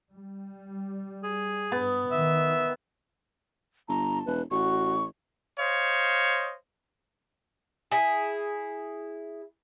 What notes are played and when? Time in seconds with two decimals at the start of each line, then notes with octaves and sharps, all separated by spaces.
0.13 G3
1.24 G#4
1.72 G2 B3
2.11 D#3 E5
3.88 G1 A5 A#5
4.26 E1 B4
4.51 A1 F#4 C#6
5.59 C5 C#5 D#5 F5
7.92 E4 G#4